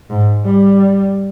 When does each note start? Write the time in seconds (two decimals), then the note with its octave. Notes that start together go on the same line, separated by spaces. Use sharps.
0.10 G#2
0.45 G3